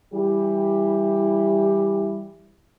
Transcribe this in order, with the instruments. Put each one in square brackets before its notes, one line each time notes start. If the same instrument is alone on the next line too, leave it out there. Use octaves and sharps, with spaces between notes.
[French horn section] E3 G3 E4 G4